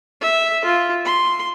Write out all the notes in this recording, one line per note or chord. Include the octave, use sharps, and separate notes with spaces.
E5
F4
C6